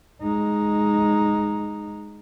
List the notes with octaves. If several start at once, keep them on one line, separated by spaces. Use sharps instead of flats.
G#3 D#4